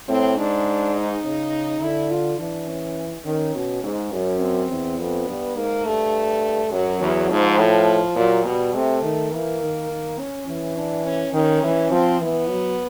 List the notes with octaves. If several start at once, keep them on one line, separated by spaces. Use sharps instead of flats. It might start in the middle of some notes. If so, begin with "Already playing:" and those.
A2 C4
G#2 D4
D#4
C#3
D3 E4
F4
E3 D4
C#4
D#3 C#4
B2
G#2
F#2 C#4
C4
E2
F2 B3
G2
G#2 A#3
G2 A3
F#2 F#3
E2
G#2 F3
A2 F3
A#2 F#3
B2 G3
C3 A3
D#3
E3 A#3
D#3
D#3
C#4
E3 C#4
D4
C#4
D#3 C#4
E3
F3 C4
E3 B3
F#3